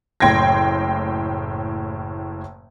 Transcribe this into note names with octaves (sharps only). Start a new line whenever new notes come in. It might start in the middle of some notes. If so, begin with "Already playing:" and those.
F#1 A2 G5 C6 G#6 A#6